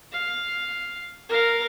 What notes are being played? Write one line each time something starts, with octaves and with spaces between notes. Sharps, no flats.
F5
A#4 F5